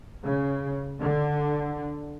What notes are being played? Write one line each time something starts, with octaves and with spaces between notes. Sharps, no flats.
C#3
D3